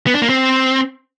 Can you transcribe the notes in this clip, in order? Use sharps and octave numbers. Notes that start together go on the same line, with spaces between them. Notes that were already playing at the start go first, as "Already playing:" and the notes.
B3
D4
A#3
C4